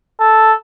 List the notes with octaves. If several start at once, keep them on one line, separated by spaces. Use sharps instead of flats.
A4